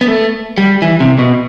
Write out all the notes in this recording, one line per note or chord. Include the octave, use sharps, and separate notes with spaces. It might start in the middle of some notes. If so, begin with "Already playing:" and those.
B3
A3
G3
E3
C3
B2